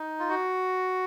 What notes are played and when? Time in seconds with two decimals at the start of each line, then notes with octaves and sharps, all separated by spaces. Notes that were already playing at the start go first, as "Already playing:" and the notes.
Already playing: D#4
0.19 F4
0.29 F#4